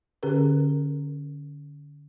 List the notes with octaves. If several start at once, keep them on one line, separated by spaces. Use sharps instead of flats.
D3 C#4 G4 G#4 A#4 B4